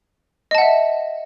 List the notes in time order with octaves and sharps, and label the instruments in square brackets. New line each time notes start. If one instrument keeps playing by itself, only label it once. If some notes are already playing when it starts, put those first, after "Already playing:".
[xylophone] D#5
A5
F#5
E5